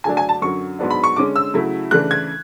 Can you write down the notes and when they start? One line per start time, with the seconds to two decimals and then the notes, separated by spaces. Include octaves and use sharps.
0.04 D3 F#3 A3 D4 G#5
0.17 G#5
0.29 A5
0.42 F#2 D3 F#3 C#6
0.79 G#2 F#3 B3 D4
0.90 B5
1.04 C#6
1.16 D3 G#3 C#4 D6
1.36 E6
1.54 C#3 F#3 A3 E4
1.91 C#3 E3 A3 D4 F#6
2.11 G#6